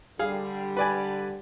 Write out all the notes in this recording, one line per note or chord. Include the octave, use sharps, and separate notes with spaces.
D3 G3 G#4 F5
B4 D5 G#5